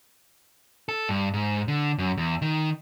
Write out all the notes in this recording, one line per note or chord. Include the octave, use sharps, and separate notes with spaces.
A4
G2
G#2
D3
F#2
E2
D#3